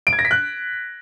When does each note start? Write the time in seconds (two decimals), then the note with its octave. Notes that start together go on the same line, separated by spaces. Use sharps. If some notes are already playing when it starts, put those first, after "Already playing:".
0.07 D7
0.13 G#6
0.19 A#6
0.25 B6
0.31 F#6